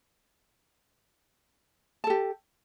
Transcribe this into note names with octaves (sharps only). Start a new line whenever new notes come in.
G4 A4 A5